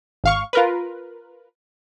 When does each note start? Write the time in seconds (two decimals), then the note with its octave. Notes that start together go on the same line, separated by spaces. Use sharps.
0.24 G#1 F5 C#6
0.53 F4 A#4 B4